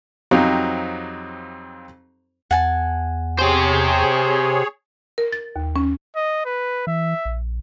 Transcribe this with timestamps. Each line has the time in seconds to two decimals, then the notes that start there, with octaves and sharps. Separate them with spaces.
0.31 F2 F#3 C4 D#4 G4 F5
2.51 E2 F#5 G#5 A5
3.39 G4 G#4 C5 C#5
5.18 A#4
5.32 A6
5.56 D#2
5.76 C#4
6.16 D#5
6.45 B4
6.87 E3 E5
7.25 A#1